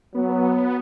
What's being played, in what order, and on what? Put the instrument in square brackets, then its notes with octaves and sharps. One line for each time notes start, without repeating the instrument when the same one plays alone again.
[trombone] F#3 [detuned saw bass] B3